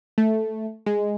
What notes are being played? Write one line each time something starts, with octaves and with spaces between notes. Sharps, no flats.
A3
G#3